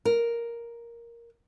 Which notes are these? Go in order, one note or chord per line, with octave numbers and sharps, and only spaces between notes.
A#4